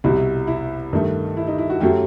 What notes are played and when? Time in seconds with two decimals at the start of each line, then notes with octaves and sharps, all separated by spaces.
0.04 C2 B2 G3 E4
0.47 E4
0.93 G2 D#3 A3
1.37 E4
1.48 D#4
1.58 E4
1.70 F#4
1.80 F#2 F#3 A3 G4